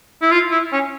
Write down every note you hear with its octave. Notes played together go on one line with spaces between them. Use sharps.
E4
F4
E4
C#4